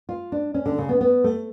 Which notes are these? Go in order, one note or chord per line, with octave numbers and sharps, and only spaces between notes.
F4
D4
C#4
D3
C#3
B3
B3
A3